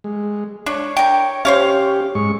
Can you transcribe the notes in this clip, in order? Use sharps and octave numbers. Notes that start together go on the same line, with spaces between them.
G#3
D4 C#5
A#4 G5
C#4 G4 C5 C#5 F5
G#2 G#3 C#6